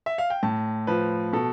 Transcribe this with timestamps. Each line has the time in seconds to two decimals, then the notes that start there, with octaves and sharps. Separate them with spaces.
0.06 E5
0.18 F5
0.30 G5
0.43 A2 A5
0.87 F3 B4
1.33 B2 A4